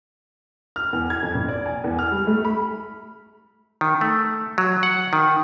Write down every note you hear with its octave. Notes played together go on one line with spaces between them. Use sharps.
F6
E2
G#6
F2
A#1
D5
G#5
E2
F6
G3
A3
B5
D#3
A3
F#3
F#5
D#3